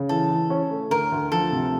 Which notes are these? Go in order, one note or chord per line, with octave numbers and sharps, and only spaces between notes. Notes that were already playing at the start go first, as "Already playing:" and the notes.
Already playing: C#3
E3 A4
E3
C#4
A3
D2 A#4
D2
F3 A4
C3